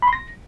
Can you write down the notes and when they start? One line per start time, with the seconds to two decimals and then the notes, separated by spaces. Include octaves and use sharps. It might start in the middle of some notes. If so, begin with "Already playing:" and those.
0.02 B5
0.08 C6
0.13 A#6